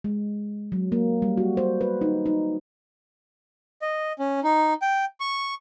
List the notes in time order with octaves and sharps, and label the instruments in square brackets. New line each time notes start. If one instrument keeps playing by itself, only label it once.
[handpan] G#3
F#3
A#3
G3
F#4
C5
B4
D#4
D#4
[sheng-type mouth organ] D#5
C#4
D#4
G5
C#6